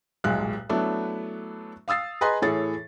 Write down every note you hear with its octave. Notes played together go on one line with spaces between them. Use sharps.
D#1 B1 G#2 G#3 F#6
F#3 A3 B3 D4 E4
F5 D#6 E6 A6 C7
G#4 B4 D#5 G#5 A#5 C6
A2 E3 G#4 A4 C#5 A6